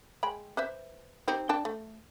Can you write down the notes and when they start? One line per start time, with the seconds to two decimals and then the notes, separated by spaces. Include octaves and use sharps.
0.23 G#3 G5 B5
0.57 B4 C5 E5
1.28 C4 D#4 G4
1.49 D4 G5 A5
1.65 A3